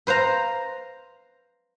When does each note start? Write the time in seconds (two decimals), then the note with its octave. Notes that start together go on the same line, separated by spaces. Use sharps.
0.07 B4 C5 F5 A#5